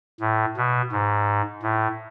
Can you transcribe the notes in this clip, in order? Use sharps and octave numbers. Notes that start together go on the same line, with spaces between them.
A2
B2
G#2
A2